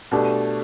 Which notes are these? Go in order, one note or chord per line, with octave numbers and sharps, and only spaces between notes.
B2 A3 D4 G4